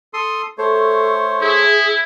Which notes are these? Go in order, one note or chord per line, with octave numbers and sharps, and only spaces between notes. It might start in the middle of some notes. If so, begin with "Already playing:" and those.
A4 C6 D#6
A3 A4 C5 C#5
E4 G#4